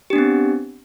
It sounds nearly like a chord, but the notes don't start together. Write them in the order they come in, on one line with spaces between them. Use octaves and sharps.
G4 D4 B3 C4